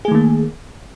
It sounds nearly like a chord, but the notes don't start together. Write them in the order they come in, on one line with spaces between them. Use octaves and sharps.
G#4 A3 D#3 A#3